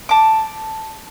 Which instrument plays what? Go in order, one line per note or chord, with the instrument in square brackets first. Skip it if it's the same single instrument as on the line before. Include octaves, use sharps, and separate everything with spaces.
[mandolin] A5 D6